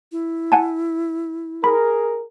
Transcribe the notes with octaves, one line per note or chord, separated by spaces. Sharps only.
E4
F#5 G#5 A5
G#4 A#4 B5